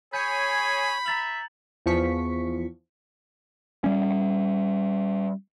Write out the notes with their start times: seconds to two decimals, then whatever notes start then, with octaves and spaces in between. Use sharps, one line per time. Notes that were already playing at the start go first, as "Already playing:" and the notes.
0.13 G#4 C#5 G#5 B5 G6 C#7
1.06 E5 A#5 A6 F#7
1.86 E2 F3 C#6 B6
3.84 G3 C#4